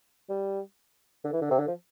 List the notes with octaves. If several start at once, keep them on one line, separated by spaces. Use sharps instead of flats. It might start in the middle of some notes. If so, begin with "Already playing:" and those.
G3
D3
E3
D3
C3
D3
F3